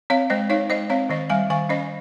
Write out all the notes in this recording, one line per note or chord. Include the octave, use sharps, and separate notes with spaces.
C4 C#5 F5
G#3 C5 D#5
D#4 C#5 F5
G#3 C5 D#5
C4 C#5 F5
D#3 C5 D#5
G3 F5 G#5
D#3 F5 G#5
C#4 C5 D#5